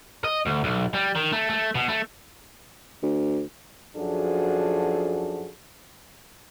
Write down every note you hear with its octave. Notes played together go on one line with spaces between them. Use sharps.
D#5
D2
B1
G3
D#3
A3
A3
B2
A3
D2
F#2 F3 D4 F#4 G#4 A4